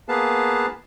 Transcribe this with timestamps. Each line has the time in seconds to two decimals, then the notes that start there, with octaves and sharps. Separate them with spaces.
0.09 A#3 B3 G#4 B4 F5 A5